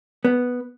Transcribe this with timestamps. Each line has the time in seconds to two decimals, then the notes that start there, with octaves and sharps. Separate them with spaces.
0.25 B3